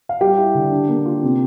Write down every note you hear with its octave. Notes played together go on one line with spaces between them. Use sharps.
F5
G3 G4 G5
E4
D3
D4
A#3
F4
C3